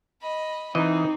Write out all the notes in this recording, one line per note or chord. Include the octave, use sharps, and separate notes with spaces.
D#5 B5
E3 C4 D#4 D#5